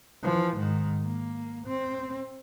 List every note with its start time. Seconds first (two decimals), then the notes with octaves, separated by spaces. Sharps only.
0.23 E3 F3
0.57 G#2 D#3
1.04 A#3
1.67 C4